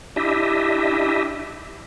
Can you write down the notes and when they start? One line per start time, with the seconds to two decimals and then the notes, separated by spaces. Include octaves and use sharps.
0.16 D4 E4 G4 D#5 E5